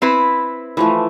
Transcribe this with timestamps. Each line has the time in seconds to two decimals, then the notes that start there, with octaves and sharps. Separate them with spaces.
0.02 C4 E4 B4
0.77 E3 F3 A3